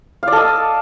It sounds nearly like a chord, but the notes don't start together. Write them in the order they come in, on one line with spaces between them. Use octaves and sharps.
F5 D5 A4 D#5